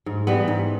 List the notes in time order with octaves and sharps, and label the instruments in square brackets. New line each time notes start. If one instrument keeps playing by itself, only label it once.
[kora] G#2
E3 G3 B3
G#2